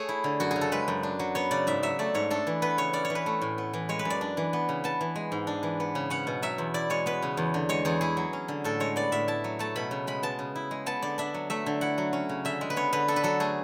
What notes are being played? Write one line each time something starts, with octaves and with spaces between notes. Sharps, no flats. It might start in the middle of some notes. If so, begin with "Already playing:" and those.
Already playing: A3 G#4 C#5
E4
D3
F#2 F#4
G#4
C#3
A4
G#3 B4
F#2
D4
F#3
B3 C#5
C#3 D5
G#2 E5
F#3 E5
A3 D5
G#2 C#5
D4 A4
E3
B3 B4
C#3 C#5
C#4 D5
C#5
E3
B4
A3
A2
B3
E3
G#3 C#5
B4
F#2
D5
D4
E3
B3
C#3
B3 A5
E3
G#3
G#2
D4
E3
B3
C#3
C#4 F#5
B2
F#3 E5
E2
E4 D5
G#3 C#5
B3 B4
C#3
E2
D3
G#3 C#5
E2 G#4
E4 G#4
F#3
C#4
D3
A2 A4
G#3 C#5
B3 D5
A2 E5
E4 A5
F#3
A3 A5
B2 B5
C#3
G#3 B5
B3 A5
C#3
E4
G#3
B3 A5
D3 D5
D4 E5
F#3
A3 E5
D3
E4 F#5
F#3
C#4
C#3
D3 E5
G#3
B4
B3 C#5
D3 B4
D4 A4
B4
F#3 A4
A3 G#4